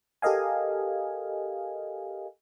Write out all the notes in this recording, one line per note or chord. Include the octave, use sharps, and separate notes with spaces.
G4 A4 A#4 D#5 F5 G#5